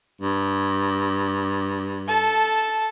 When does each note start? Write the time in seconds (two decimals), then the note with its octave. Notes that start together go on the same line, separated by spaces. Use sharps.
0.21 G2
2.08 A4 A5